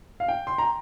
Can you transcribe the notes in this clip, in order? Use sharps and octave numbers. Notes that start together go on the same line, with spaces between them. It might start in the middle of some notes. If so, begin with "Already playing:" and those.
F5
G5
C6
A#5